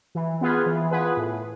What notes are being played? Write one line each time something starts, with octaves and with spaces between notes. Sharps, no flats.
E3
B3 F4 G#4 B4
E3
B3 F4 G#4 B4
A2